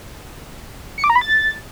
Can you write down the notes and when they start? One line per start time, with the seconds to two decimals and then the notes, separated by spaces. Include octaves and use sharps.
0.98 C#7
1.04 D6
1.10 A#5
1.16 B5
1.21 A6